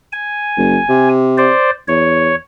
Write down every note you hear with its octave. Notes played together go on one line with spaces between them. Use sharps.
G#5
F#1
C3
C5 D5
E2 C#5